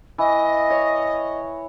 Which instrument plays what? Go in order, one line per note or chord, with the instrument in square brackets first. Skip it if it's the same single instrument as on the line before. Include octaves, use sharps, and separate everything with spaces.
[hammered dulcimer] E3 [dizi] D#5
[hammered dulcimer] C#5